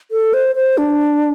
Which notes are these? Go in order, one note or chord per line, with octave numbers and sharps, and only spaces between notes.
A4
C5
C5
D4